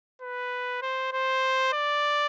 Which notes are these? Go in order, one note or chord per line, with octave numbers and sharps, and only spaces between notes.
B4
C5
C5
D5